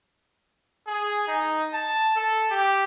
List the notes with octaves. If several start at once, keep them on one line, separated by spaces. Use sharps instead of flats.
G#4
D#4
A5
A4
G4